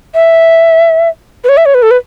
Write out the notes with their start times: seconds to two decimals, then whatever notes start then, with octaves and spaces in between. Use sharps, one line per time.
0.14 E5
1.44 B4
1.49 C#5
1.57 E5
1.66 C#5
1.74 B4
1.82 A4
1.91 B4